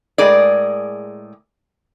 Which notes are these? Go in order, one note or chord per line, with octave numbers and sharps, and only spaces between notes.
A2 G#3 G#4 A#4 D5